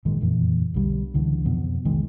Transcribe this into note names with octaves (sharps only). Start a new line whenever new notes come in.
A#1 G#2 D#3 G#3
F#1 F2 A#2 E3
B1 D3 G3
C#2 D3 E3
F2 B2
C2 D#3 G#3